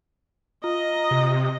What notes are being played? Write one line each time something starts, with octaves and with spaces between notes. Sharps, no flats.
F4 D#5 A#5
C3